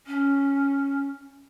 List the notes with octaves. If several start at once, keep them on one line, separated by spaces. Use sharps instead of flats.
C#4